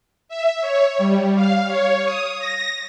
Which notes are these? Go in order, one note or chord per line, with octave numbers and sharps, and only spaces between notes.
E5
C#5
G3
F5
C#5
D#6
A#6